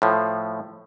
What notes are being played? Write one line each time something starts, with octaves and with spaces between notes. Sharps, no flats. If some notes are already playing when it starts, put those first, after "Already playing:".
A2 F3